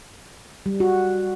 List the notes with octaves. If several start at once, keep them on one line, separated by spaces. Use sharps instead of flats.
G3
F#4